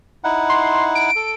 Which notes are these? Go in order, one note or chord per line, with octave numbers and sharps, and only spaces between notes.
D#4 E4 F#5
C6
D7
A4